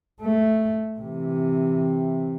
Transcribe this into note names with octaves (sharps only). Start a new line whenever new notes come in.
A3
C3 E3